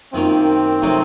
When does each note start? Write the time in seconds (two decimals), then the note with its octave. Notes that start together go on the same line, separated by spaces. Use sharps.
0.14 F#2 D#3 A#3 C4 F4
0.82 C3 F#3 A3 D#4